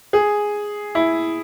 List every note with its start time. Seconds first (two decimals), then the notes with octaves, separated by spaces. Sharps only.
0.13 G#4
0.95 E4